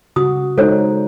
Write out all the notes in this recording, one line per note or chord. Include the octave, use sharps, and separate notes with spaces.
C#3 F#4 D#6
G#3 D#4 A4 C5 C#5